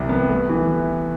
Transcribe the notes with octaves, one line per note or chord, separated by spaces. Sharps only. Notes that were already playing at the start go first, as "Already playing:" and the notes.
Already playing: C2 C3 E3
B3
A3
E3